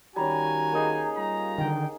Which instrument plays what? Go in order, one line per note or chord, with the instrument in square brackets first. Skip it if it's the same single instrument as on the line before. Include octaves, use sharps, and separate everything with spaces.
[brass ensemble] D#3 F#4 G#5 [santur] G3 C#4 [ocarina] A#5
[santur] A#3 D#4 G#4
[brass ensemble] G3 F4 A#5
[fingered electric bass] D3 D#3 [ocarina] G5